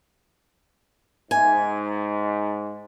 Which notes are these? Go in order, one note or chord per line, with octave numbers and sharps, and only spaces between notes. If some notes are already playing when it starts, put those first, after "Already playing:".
G#2 G#5